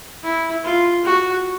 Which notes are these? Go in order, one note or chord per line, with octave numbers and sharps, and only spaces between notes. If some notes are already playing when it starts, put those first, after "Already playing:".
E4
F4
F#4